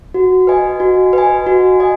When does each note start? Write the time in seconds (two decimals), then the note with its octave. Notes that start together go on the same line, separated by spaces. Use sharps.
0.14 F#4
0.47 B4 D#5 G#5
0.80 F#4
1.13 B4 D#5 G#5
1.47 F#4
1.80 D#5 G#5